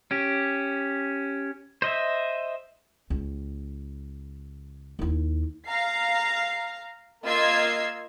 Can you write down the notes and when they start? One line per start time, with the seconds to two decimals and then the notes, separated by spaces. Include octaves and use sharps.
0.11 C#4 G4
1.82 C5 D#5 E5
3.10 C#2
4.99 D#2 E4
5.67 F5 A#5 C7
7.25 A#3 F4 D#5 E6 G#6 C7